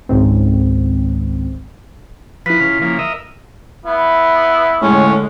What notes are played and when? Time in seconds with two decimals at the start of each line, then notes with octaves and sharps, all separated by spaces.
0.09 G#1 C#2 G#2 C4
2.46 F3 E4 B4 B6
2.60 C#3 F4
2.82 C#3 F3 A#3
2.99 A#4 D#5 E5
3.86 B3 E4
4.81 A2 D3 G#3 C#4